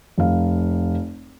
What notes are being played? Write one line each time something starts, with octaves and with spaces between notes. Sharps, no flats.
F1 F5